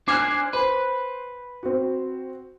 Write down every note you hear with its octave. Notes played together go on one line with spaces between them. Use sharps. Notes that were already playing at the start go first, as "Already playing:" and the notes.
D4 C5 G#5 D6 F6 F#6
B4 C5
C4 F#4